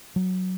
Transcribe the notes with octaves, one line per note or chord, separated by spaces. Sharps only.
F#3